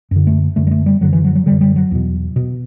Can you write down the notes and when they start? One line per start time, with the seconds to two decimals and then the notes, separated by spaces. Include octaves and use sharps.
0.11 F#2 D3
0.27 A3
0.56 F#2 D3 A3
0.67 G3
0.71 A3
0.86 G3
1.01 F#2 D3 F#3
1.13 E3
1.25 F#3
1.35 F#3
1.46 F#2 D3 G3
1.61 G3
1.76 F#3
1.91 E2 B2
2.36 B2